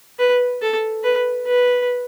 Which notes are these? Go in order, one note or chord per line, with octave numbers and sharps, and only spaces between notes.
B4
A4
B4
B4